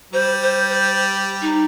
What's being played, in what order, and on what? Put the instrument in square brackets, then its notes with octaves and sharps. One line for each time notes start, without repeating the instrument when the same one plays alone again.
[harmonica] G3 [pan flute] C5
[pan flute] C5
C5
D#4